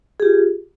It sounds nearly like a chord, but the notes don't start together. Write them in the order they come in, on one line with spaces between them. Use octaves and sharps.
G#4 G4 F4